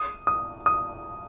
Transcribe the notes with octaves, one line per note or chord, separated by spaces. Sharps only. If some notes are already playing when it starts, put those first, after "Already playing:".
Already playing: D#6
D#6
D#6